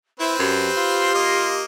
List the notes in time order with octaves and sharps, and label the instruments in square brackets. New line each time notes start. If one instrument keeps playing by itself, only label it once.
[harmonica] C4 B4 C5 [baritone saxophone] E4 [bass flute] E5
[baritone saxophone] F#2 [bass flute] G4
[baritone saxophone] F4
[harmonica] A#3 D#5